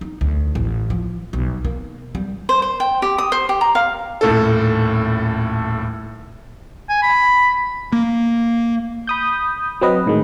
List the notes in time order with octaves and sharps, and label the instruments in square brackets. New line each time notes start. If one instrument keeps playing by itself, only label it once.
[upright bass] D#4
D2
A1
F3
B1
A#3
G3
[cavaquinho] C5
C5
G5
G4
D#6
C5
G4
A#5
F5
[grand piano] D#1 A2 A4
[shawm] G#5
B5
[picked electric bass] A#3
[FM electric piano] B5 D#6 G6
F#3 C4 B4 D#5
A2 D#3 G#3